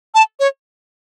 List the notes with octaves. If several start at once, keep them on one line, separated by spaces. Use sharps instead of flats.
A5
C#5